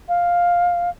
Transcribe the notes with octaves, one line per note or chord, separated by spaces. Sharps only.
F5